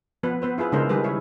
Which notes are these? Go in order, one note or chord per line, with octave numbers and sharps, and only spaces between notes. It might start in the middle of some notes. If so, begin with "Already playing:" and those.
F3 B3 B4
B3 B4 C5
E4 F4 G#4 B4
C#3 G#3 D4 E4 A#4 C5
D#3 G3 G#4 A#4 B4
E4 C#5